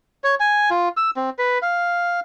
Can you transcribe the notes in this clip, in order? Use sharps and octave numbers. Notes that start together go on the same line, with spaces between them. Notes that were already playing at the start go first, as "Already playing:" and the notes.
C#5
G#5
F4
E6
C4
B4
F5